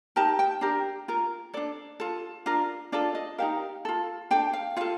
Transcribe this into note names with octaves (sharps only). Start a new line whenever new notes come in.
D#4 G4 A#4 A5
G5
D4 G4 A#4
F4 A#4
D4 A4 D5
F4 A4
D4 F4 A#4
D4 F4 A4 D5
D#5
D#4 G4 A#4 F5
F4 A4
D4 A4 G5
F5
F4 A4 F5